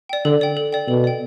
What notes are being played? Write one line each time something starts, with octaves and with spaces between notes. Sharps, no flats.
D5 G5
D3 A4
D5 G5
A4
D5 G5
B2 A4
D5 G5